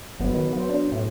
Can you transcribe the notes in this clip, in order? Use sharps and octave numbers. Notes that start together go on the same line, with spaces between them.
G1 F#3 B3
D#3
F#3 B3 C5
D4
A2